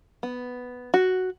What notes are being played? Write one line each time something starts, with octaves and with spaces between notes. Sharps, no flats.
B3
F#4